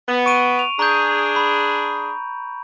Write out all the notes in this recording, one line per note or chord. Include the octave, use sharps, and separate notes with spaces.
B3
C#6 D7 D#7
F7
D4 G#4 A#5 C#6 G6
B5